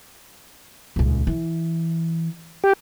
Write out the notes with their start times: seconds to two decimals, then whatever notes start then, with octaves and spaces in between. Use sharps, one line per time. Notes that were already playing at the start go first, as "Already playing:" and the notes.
0.96 D#1 C#2
1.27 E3
2.64 G4